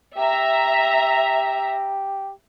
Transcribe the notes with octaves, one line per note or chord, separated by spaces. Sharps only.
G4 E5 A#5